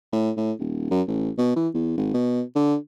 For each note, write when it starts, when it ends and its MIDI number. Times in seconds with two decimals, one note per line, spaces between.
0.13 0.31 45
0.37 0.52 45
0.59 0.87 27
0.91 1.02 42
1.08 1.30 33
1.38 1.54 47
1.56 1.68 52
1.74 1.95 40
1.97 2.13 32
2.14 2.42 47
2.55 2.76 50